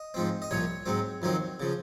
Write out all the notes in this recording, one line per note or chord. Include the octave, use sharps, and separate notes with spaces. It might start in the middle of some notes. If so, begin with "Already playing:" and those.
Already playing: D#5
G#2 F3 C4
D#5
C2 A#2 F3 C#5
G#2 F#3 C4
F2 D#3 F#3 C4
C#3 F3